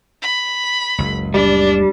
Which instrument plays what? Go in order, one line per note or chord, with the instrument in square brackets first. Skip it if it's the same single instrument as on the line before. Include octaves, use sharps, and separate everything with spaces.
[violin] B5
[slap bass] F#1 C#2
[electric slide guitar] G3 [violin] D4